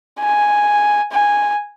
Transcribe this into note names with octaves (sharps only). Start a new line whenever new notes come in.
G#5
G#5